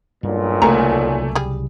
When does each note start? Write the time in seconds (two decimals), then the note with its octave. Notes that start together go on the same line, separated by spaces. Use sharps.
0.23 B1 G2 A#2
0.62 C2 C#3 F#3 A3 A#3 G#5 A#5
1.35 G3 G#4